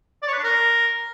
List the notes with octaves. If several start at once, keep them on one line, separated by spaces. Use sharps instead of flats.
D5
C#5
B4
D4
A#4